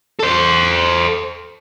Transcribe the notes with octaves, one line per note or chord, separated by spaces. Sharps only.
A4 C5